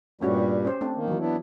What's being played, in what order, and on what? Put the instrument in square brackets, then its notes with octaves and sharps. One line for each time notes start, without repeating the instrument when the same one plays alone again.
[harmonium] G2 A#2 G3 [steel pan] A3 C#4 F#4
[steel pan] C#4 G4 C5
A3 C4 D4
[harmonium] D#3 A#3
[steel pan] E3 F#3
[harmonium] B3 D4 E4